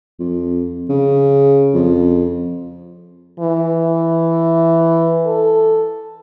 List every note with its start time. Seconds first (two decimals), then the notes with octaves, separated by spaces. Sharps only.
0.19 F2
0.89 C#3
1.74 F2
3.40 E3
5.27 A4